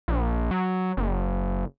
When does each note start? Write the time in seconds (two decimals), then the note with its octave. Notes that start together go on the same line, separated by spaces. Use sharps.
0.08 A#1
0.51 F#3
0.97 F#1